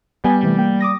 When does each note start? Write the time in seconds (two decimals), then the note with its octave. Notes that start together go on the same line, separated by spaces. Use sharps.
0.24 G3 B3 G#5
0.42 C3 E3 A3
0.58 A#3 G5
0.80 D6 D#6 A#6